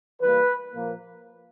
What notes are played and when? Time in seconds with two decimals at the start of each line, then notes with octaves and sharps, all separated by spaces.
0.21 E3 G3 A#3 B4
0.74 A#2 F3 A#3